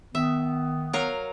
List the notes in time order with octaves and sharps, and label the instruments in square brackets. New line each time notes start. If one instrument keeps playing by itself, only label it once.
[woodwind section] D#3 B3 [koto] E5
[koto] F#3 A#4 F5